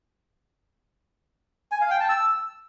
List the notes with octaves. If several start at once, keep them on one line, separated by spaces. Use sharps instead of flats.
G#5
F5
G5
A5
E6